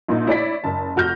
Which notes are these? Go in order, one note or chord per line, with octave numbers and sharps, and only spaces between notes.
A#1 A#2 D#4
E4 C#5 D5 B6
F#1 A5
F1 F#4 F6 G6 A#6